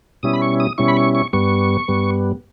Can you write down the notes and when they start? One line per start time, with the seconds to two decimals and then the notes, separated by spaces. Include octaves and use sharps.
0.23 B2 G3 C#4 E4 D#6
0.33 B5
0.42 C#6
0.60 D#6
0.78 B2 G3 C#4 E4 C#6
0.88 B5
0.97 C#6
1.15 C#6
1.33 G2 G3 B3 C#6
1.88 G2 G3 B3